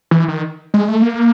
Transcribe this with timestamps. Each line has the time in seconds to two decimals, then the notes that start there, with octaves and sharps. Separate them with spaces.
0.11 E3
0.28 D#3
0.74 G#3
0.88 A3
1.02 A#3